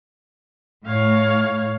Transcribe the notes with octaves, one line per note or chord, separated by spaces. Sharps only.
A2 C#5 F5